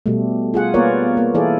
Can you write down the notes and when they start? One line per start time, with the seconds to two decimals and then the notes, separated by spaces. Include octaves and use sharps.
0.06 B2 G3 A3
0.54 F4 G#4 F#5
0.74 A#3 B3 F4 A#4 C#5 D5
1.17 A#3
1.34 E3 E4 G#4 A4 D5